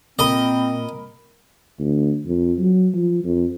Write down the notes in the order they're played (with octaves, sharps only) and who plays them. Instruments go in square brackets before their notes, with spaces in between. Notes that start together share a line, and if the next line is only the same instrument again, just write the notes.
[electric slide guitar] A#2 [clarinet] C4 [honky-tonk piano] A#4 B5 [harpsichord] D#5
[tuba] D2
F2
F#3
F3
F2